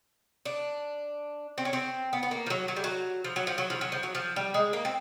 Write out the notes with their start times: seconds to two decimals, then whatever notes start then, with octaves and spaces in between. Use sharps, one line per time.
0.46 D4
1.58 C4
1.65 C#4
1.73 C4
2.13 B3
2.23 B3
2.31 A#3
2.46 F3
2.50 F#3
2.68 F#3
2.76 G3
2.84 F#3
3.24 F3
3.36 F#3
3.47 F3
3.58 F#3
3.70 F3
3.81 F#3
3.92 F3
4.03 F#3
4.15 F3
4.36 G3
4.54 G#3
4.73 A#3
4.85 C4